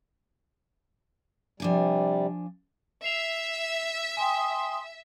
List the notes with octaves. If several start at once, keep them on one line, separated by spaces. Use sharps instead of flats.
C3 F3 G3 D4 G#5
E5 C7 F7
G5 G#5 C6 D#6